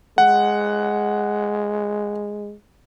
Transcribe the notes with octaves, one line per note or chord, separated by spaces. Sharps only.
G#3 F#5